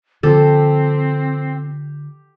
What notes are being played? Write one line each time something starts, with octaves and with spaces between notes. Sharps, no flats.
D3 F3 C4 G4 A4